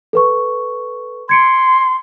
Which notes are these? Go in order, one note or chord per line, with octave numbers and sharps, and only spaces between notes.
A4 B4 C#6
C6 G#6 C#7 D7